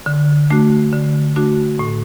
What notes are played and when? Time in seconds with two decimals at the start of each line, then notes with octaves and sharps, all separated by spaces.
0.06 D3
0.50 A3 D4 F#4
0.93 D3
1.36 A3 D4 F#4
1.79 A2